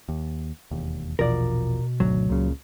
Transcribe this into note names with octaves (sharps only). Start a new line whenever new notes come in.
D#2
E1 D#2
A#1 E2 B2 F3 A#4 D5
G#1 D2 F#3
C#2 A#2 C#3